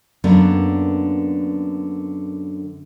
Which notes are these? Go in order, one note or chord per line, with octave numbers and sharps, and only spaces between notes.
F#2 D3 A#3 B3 D4